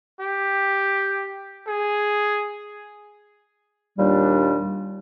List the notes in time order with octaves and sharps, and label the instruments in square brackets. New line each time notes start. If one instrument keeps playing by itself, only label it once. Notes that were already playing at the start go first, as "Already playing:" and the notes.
[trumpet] G4
G#4
[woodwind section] D#2 A#2 G3 D4